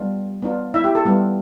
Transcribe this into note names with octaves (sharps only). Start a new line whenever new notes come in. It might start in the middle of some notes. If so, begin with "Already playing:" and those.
Already playing: G3 B3 D4 F4
B3 D4 F4
E4 E5
G4
A4
G3 B3 F4